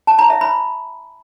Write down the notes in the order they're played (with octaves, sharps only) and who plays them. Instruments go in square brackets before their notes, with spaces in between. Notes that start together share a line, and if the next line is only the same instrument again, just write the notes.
[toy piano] A5
A#5
E5
B5